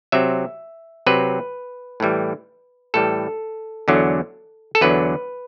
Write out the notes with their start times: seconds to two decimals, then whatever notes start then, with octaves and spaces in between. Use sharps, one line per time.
0.12 C3 F#3 C4 E5
1.06 C3 F#3 C4 B4
2.00 A2 E3 G3
2.94 A2 E3 G3 A4
3.88 E2 D3 F#3
4.75 A4
4.81 E2 D3 F#3 B4